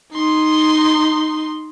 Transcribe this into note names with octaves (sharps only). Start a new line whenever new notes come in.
D#4 C6